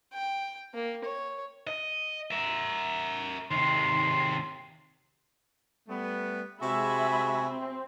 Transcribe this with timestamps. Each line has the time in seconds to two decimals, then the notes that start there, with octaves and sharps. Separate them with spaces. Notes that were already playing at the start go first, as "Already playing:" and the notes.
0.13 G5
0.74 A#3
1.05 C#5
1.67 D#5
2.31 A#4 E5
3.51 D#2 C3 C6
5.88 G3 A3 B3
6.61 C3 G#3 F#4 E5 G#5 B5
7.47 C4